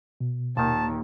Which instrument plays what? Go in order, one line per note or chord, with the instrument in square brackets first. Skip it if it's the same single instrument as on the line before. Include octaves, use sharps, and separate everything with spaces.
[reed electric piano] B2
[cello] D#2 [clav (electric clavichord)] A#2 D#3 [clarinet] A5